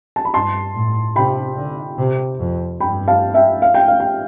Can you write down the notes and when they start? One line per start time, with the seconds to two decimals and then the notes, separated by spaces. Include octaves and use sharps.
0.16 A5
0.25 B5
0.34 G2 A5 C6
0.75 A2
1.16 C3 G5 B5
1.57 D3
1.98 C3
2.40 F2
2.80 G2 G5 B5
3.08 F5 A5
3.34 E5 G5
3.62 F5
3.74 G5
3.88 F5
4.00 G5